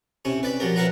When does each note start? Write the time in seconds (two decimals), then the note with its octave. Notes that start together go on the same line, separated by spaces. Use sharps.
0.25 C3 C#4 E4
0.43 B4 D5 B5
0.60 F3 F#3 G4 A#4
0.76 E4 A#4 B4 F5 F#5 A#5